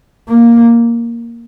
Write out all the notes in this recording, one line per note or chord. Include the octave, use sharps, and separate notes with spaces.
A#3